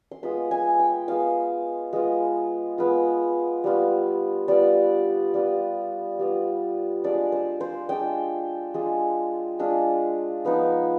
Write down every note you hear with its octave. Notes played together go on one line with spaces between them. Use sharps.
C6
G#3 B3 F4 B5
G#5
G5
G#3 B3 F4 F5
G#3 B3 F4
G#3 B3 F4
G3 B3 F4
G3 B3 F4 D5
G3 B3 F4
G3 B3 F4
G#3 D4 F4 D5
C5
C5
G#3 D4 F4 G5
G#3 D4 F4
G#3 D4 F4
F3 B3 D#4